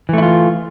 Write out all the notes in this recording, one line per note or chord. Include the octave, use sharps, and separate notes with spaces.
E3 A3 E4 F4